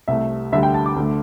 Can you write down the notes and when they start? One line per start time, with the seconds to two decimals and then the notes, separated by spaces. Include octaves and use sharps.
0.08 C2 C3 A3 E5
0.52 D2 D3 G3 E5
0.63 G5
0.74 A5
0.86 D6
0.96 D2 D3 A3